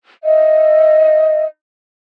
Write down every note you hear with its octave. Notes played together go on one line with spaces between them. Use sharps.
D#5 E5